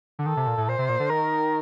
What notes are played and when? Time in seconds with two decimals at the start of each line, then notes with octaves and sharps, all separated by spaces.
0.19 D3
0.26 D#3 A4
0.37 C3
0.47 A#2
0.58 A2
0.68 A#2 C5
0.79 C3
0.89 A#2
1.00 D3
1.10 D#3 A#4